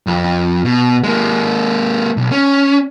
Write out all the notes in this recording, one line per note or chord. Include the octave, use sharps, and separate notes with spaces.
F2
B2
G#3 A#3
B1
C#4